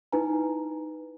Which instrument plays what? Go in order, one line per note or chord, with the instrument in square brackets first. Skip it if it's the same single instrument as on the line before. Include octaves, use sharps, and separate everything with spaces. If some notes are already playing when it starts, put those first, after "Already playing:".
[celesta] D#4 E4 B4 G#5 A#5